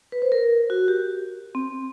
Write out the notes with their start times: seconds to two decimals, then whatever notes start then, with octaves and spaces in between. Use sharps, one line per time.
0.12 B4
0.22 C5
0.32 A#4
0.70 F#4
0.88 G4
1.55 C4